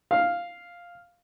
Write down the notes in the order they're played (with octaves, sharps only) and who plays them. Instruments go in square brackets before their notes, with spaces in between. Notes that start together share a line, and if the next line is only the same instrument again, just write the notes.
[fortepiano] F5